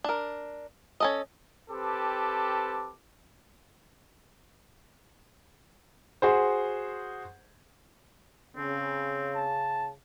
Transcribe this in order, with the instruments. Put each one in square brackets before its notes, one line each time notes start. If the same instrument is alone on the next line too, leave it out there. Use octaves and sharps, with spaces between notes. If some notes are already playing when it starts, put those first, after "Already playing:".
[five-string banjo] D4 A#4
C#4 A4 D#5
[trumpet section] C4 G4 A4 B4 A5 D6
[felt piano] F#4 G#4 C5
[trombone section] C#3 [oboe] C4
[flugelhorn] A5